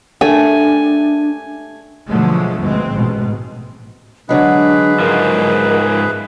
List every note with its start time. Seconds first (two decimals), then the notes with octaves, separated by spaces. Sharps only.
0.21 A3 D4 G#5
2.08 B2 D3 F3 F#3 G#3 A3
2.60 D2 B2 G#3 C4
2.92 A1 G#2 B2 G#3
4.29 D3 F#3 G#3 D4 G#4 B4
5.00 G#2 F3 A#4